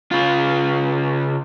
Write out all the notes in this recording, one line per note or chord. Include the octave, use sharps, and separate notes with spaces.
C#3 F4